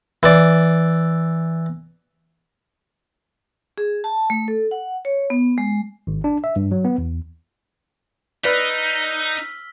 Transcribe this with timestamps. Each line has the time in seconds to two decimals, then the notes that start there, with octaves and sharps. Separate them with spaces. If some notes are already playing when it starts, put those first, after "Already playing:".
0.23 E3 D5
3.78 G#4
4.04 A5
4.30 A3
4.48 A4
4.71 F#5
5.05 C#5
5.30 B3
5.58 G#3
6.07 G#1
6.24 D4
6.44 E5
6.56 G2
6.72 F#3
6.85 B3
6.98 E2
8.44 D#4 B4 D5 E6 F6 B6